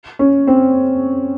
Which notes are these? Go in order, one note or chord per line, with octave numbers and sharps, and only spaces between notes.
C#4
C4